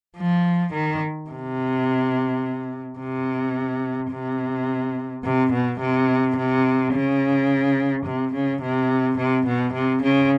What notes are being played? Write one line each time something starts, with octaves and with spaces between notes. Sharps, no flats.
F3
D#3
C3
C3
C3
C3
B2
C3
C3
C#3
C3
C#3
C3
C3
B2
C3
C#3